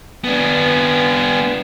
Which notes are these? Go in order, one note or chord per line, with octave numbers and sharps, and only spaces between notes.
B3 D4